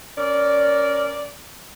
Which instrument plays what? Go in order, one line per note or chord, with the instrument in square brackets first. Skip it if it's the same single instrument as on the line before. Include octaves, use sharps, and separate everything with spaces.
[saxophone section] C#4 A#4 D5